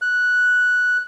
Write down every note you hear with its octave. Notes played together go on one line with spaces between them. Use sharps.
F#6